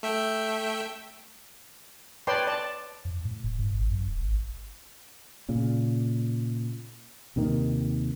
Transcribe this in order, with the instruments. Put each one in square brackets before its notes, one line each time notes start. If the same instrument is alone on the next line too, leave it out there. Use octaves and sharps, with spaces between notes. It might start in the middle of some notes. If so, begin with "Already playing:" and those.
[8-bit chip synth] A3 E5 G5
[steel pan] B4 C#5 D5 G5 A5 C6
D5 A5
[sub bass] F2
A2
E1
G#2
G#1
F#2
D#1
G#1
[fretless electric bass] A#2 C#3
D#2 C3 D#3 A#3